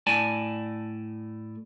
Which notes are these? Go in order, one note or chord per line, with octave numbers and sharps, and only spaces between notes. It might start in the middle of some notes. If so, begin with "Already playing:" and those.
A2 D5 G#5 A5